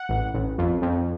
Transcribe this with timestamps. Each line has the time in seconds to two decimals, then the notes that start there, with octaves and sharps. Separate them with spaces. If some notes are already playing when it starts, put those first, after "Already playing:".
Already playing: F#5
0.09 A1
0.34 A1
0.58 F2
0.82 F2